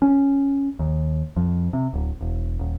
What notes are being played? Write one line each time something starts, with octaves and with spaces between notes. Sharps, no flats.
C#4
D#2
F2
C3
D1
E1
D#1